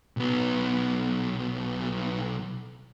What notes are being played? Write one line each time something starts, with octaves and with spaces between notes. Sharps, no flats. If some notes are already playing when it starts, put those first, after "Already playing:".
B1 B3